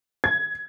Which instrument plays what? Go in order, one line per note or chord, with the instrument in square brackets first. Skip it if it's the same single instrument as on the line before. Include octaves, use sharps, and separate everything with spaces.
[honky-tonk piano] G#6